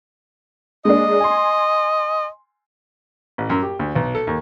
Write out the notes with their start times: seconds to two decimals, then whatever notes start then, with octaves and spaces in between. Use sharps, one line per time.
0.85 G#3 A#3 D4 D#5
1.20 G#5 C6
3.38 A1
3.50 F#2
3.62 G4
3.79 D2
3.96 B1
4.15 A4
4.27 D#2